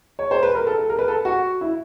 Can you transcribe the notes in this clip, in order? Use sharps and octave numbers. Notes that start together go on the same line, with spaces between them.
C#5
C5
B4
A#4
A4
A4
A#4
B4
A4
F#4
E4